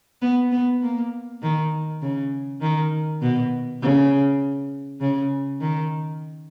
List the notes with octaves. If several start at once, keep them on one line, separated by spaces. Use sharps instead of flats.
B3
B3
A#3
D#3
C#3
D#3
B2
C#3
C#3
D#3